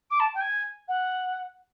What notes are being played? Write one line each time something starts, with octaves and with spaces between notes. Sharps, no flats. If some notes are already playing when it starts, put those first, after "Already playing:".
D6
A5
G5
G#5
F#5